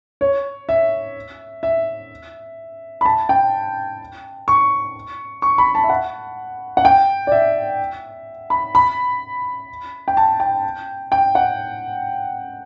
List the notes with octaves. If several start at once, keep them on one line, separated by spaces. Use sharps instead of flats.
C#5
E5
E5
B5
A5
G5
C#6
C#6
B5
A5
E5
F#5
F#5
G5
D5
E5
B5
B5
G5
A5
G5
G5
F#5